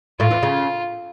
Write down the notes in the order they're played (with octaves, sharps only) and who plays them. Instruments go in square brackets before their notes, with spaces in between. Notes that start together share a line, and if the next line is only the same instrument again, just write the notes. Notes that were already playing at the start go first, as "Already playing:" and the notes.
[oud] A2 A3 [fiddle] F4
[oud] E2 E3
C#3